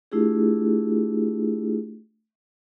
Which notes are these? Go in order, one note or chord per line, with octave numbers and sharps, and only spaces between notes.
A3 D4 E4 F4 G4 G#4